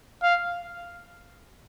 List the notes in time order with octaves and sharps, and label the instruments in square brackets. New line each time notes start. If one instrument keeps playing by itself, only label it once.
[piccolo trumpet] F5